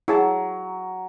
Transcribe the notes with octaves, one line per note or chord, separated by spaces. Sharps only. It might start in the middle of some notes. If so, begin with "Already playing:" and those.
F#3 E4 G#4 A5